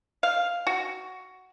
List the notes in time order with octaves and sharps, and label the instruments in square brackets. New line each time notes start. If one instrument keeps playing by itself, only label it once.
[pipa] F5
F#4